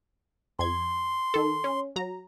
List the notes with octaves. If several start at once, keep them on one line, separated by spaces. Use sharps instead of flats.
F2 C6 G#6
D#3 A4
C#4
F#3 A#5